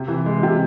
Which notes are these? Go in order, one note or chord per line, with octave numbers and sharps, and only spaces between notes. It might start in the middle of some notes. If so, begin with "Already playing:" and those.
Already playing: C3
E3
G#3
C3